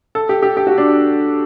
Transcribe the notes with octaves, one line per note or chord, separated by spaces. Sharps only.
A4
G4
G4
G4
F#4
D4